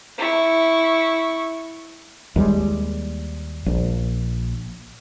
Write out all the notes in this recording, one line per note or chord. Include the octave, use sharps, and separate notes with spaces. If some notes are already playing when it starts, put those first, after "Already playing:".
E4 C#6
D#2 G3 G#3
A#1